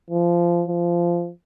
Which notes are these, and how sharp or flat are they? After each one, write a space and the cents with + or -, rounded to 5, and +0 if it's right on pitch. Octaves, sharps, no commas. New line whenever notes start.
F3 -20
F3 -15